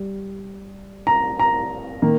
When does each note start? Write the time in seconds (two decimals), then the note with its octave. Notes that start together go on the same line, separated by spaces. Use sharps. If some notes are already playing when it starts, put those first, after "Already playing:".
Already playing: G3
1.07 A#5
1.40 A#5
2.02 D#3 A#3